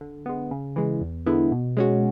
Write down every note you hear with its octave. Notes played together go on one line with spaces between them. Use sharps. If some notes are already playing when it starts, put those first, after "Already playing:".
D3
G#3 B3
C#3
E3 G#3
E2
D3 G#3 B3 E4
B2
G#3 C#4 F#4